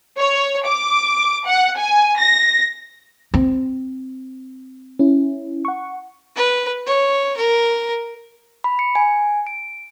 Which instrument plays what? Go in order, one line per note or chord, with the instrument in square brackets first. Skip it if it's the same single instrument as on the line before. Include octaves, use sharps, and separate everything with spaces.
[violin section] C#5
D6
F#5
G#5
A#6
[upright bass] C4
[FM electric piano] C#4 E4
F#5 C#6
[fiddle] B4
C#5
A#4
[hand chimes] B5
C#7
G#5
D7